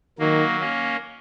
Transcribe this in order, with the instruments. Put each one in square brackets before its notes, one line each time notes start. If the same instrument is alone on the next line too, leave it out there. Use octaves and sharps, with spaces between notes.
[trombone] D#3 [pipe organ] F#3 A#3
[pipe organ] A#3 C#4